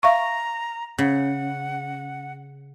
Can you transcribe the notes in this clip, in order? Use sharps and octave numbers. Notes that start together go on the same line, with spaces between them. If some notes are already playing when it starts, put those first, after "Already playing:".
E5 F5 A#5 C#6
C#3 F#5